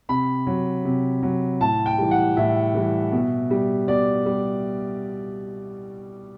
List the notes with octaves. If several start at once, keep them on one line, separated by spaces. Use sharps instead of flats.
C3 B5
F#3
C3
F#3
A2 A5
G5
E3 G3
F#5
A2 E5
E3 G3
B2
G3
B2 D5
G3